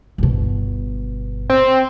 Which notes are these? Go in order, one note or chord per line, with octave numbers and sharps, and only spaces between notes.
G1 B2
C4